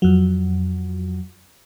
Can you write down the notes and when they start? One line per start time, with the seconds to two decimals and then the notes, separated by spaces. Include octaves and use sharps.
0.02 F2 F#3